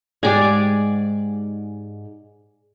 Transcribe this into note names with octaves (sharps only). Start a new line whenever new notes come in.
G#2 G4 G#4 D5